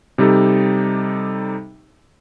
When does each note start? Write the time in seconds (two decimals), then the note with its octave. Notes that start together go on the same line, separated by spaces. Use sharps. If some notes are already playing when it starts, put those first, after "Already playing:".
0.18 C3 G3 D#4 G4 A4